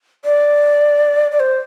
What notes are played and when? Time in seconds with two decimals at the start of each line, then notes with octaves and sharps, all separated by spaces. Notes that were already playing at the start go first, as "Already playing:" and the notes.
0.25 D5
1.32 D5
1.40 C5